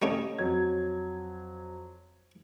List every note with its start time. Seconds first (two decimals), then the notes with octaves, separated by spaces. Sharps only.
0.02 G3 A3 C#4 D#5
0.38 F2 F#3 G#6